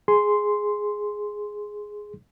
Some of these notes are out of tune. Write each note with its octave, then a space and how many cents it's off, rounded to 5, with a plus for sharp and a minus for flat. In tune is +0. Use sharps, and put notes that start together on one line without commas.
G#4 +0 C6 -5